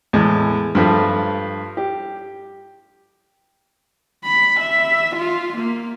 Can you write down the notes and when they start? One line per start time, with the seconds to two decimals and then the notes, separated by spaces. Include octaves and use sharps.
0.13 E2 A2 G#3
0.75 G2 F3 A3
1.77 G4
4.24 B5
4.60 E5
5.16 F4
5.58 A#3